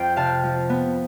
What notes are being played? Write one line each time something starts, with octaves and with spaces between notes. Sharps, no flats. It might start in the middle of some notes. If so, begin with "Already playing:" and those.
Already playing: F2 C5 G5
C3 F5 A5
F3
B3